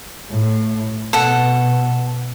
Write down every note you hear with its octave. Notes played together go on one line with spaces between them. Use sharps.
A2
B2 A4 F#5